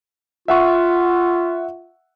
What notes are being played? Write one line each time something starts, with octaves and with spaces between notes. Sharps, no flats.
F4 E5 F#5 C#6